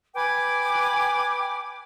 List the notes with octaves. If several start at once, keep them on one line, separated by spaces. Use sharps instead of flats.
B4 G5 G#5 D6